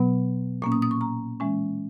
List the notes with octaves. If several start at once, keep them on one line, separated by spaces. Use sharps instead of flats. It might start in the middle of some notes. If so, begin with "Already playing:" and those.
Already playing: B2 F#3 B3
A#2 A#3 C#4 C#6
D#6
D#6
C#6
A#5
E3 G#3 C#4